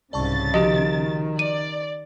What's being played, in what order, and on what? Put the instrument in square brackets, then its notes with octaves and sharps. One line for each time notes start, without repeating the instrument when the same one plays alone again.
[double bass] C2 G#2 [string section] C#3 A6 [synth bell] D5 A5 C#6
[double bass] D#3 [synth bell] F3 F#4 D7 [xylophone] G4 D#5
[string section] D5 [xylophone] D#7